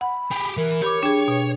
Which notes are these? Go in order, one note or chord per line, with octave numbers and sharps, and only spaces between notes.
F#5 B5
G4 G#4
E3 A#4
G4 C#5 B5 D6
D4 G#4 G5
B2